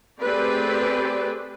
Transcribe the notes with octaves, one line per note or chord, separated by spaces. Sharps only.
A3 C4 G4 G#4 B4 D5